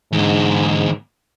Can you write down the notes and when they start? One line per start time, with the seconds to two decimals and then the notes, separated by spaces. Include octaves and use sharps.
0.13 E2 G#2 D3